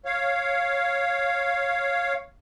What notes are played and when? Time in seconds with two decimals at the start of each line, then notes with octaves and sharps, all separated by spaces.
0.05 C#5 F5